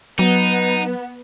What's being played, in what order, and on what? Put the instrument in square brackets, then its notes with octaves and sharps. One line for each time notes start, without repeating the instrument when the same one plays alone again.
[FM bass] F#3 [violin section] B3 [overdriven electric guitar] D#4